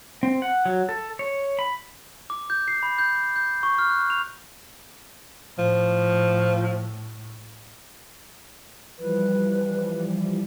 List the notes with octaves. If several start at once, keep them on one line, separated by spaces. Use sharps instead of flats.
C4
F#5
F#3
A4
C#5
B5
D6
G6
C7
B5
G6
G6
C#6
F6
F#6
F7
A2 F3
E3 F3 G3 B4